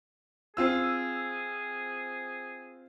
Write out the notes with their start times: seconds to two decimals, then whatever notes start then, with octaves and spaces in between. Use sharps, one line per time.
0.57 C4 F4 G#4 E6